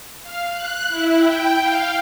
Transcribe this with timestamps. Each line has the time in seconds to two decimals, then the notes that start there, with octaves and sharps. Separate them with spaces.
0.22 F5
0.51 F#6
0.88 E4
1.18 G5
1.59 F5